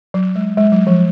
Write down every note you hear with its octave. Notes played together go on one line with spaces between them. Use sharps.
F#3
G#3
G#3
F#3
F3